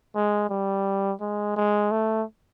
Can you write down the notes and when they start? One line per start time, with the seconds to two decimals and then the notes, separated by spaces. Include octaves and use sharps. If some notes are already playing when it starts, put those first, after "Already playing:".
0.15 G#3
0.50 G3
1.21 G#3
1.56 G#3
1.91 A3